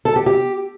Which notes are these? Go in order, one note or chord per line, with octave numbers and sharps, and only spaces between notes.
A4
G4
G4